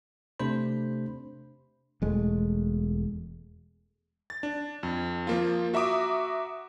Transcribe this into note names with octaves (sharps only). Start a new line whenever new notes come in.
C3 A3 D4 C5 B5
E1 G#3 A3
A6
D4
F2
F3 A#3 F4
F#4 E5 A#5 D6 D#6